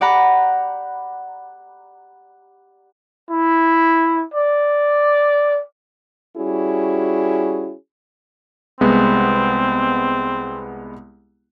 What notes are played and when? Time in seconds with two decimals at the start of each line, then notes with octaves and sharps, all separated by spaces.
0.01 G4 D5 F#5 A#5 B5
3.30 E4
4.34 D5
6.36 G3 C#4 E4 F#4 G#4
8.81 C2 G#3 B3 C4